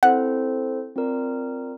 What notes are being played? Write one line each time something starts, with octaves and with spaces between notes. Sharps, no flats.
C4 E4 A4 C5 F#5
C4 F4 A#4 D5